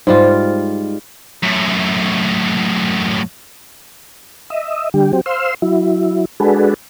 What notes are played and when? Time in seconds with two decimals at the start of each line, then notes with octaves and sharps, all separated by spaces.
0.07 G#2 G3 F4
1.43 F#2 A2
4.50 D#5 E5
4.94 D3 G3 G4
5.13 F#3 C4 G4
5.26 C5 F5 C6 E6
5.62 F#3 E4
6.40 G#3 D4 F#4 G#4 A4 B4